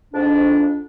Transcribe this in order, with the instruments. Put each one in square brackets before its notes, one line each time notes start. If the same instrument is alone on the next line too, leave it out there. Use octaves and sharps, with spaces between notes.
[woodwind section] F2 G#2 D4